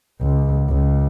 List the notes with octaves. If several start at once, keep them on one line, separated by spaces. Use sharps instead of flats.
C#2
C#2